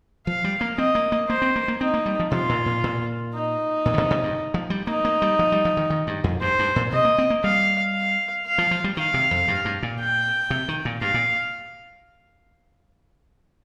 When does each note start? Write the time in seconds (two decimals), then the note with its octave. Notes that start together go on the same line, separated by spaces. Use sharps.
0.27 F3 F5
0.44 G3
0.61 A#3
0.78 C4 D#5
0.95 A#3
1.12 A#3
1.29 A#3 C5
1.42 C4
1.56 A#3
1.68 A#3
1.81 C4 D#4
1.94 A#3
2.06 G3
2.20 F3
2.31 C3 F4
2.49 A#2
2.66 A#2
2.84 A#2
3.34 D#4
3.86 A#2
3.94 D#3
3.98 C3
4.11 C3
4.23 G2
4.54 F3
4.70 G3
4.87 A#3 D#4
5.05 A#3
5.22 G3
5.39 F3
5.52 G3
5.65 F3
5.77 D#3
5.90 D#3
6.07 G2
6.24 F2
6.41 G2 C5
6.59 G2
6.76 A#2
6.92 C3 D#5
7.05 A#3
7.18 C4
7.30 A#3
7.44 G3 F5
7.95 F5
8.46 F5
8.58 F3
8.71 F3
8.84 G3
8.97 D#3 F5
9.14 C3
9.31 F2
9.48 G2
9.65 G2
9.83 A#2
9.99 G5
10.50 C3
10.68 D#3
10.85 A#2
11.01 G2 F5
11.14 A#2